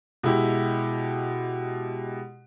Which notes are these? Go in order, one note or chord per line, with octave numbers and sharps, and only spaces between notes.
B2 G#3 E4 G4